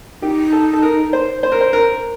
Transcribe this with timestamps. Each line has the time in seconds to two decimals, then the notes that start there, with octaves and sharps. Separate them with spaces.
0.22 D#4 G4
0.52 A4
0.73 A4
0.83 A#4
1.13 C5
1.43 C5
1.52 A#4
1.61 C5
1.73 A#4